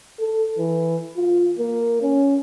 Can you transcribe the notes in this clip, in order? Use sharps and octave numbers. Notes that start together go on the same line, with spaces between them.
A4
E3
F4
A#3
C#4